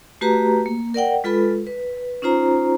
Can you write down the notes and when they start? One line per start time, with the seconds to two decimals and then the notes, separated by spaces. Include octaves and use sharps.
0.21 A3 F#4 G4 B4 A#5
0.66 A#3
0.94 A#4 D5 F#5 G5
1.24 G#3 F4 A4 B4 B5
1.67 B4
2.22 C#4 D#4 F4 C5 A#5